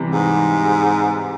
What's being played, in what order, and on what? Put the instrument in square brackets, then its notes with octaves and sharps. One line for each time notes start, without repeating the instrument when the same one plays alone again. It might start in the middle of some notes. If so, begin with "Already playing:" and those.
Already playing: [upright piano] C3 E3 G3
[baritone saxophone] G#2